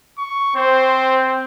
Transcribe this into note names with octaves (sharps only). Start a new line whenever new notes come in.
C#6
C4 C5